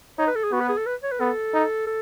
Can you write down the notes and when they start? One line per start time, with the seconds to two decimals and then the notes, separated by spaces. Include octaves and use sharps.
0.18 D#4 C#5
0.27 B4
0.35 A4
0.44 G#4
0.52 B3 F#4
0.60 B4
0.69 G#4
0.78 A4
0.86 B4
1.03 C#5
1.12 B4
1.19 B3 A4
1.54 D#4
1.87 A4